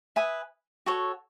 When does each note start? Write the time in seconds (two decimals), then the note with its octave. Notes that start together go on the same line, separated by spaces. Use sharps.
0.16 B4 E5 G#5 D#6
0.86 F#4 A4 C#5